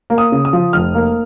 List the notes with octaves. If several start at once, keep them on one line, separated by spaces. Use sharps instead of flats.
A#3
D#6
C#3
D#6
F3
F1 F6
A#3